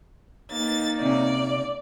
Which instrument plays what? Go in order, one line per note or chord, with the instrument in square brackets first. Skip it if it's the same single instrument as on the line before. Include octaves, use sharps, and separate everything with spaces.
[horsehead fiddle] A#3 D#4 [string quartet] A6
[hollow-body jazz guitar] C3 C#4 [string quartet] D5